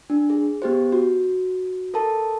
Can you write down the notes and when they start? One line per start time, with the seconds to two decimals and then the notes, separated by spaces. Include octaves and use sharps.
0.10 D4
0.30 G#4
0.62 B3 G4 C5
0.92 F#4
1.94 A4 A#4 A5